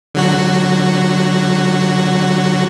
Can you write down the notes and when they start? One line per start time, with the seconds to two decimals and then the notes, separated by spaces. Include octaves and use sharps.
0.15 D3 F#3 F#4